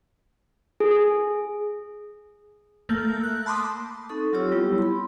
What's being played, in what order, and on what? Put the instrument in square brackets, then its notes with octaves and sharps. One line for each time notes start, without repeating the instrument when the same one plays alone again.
[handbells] G#4
[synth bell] A3 A#3 G6
F#6
A5 B5 C6 D6 D#6
[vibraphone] C4 D#4 A4 C#6
F#3 C4 F4 G4 C#5 E6
G3 B3 E4 G4
B5 C6